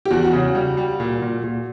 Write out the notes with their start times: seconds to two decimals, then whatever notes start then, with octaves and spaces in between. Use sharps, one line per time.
0.05 G4
0.11 E2 F#4
0.33 C#3
0.55 G3
0.77 G3
1.00 A#2
1.22 A#2
1.44 A#2